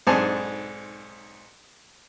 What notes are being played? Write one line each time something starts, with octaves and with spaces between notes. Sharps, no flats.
B1 G#2 C4 D4 G#5 A5